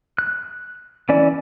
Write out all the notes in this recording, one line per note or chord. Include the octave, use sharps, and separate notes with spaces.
F#6
E3 C#4 D5